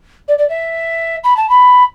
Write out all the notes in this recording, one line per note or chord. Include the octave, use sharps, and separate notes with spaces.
D5
D5
E5
B5
A5
B5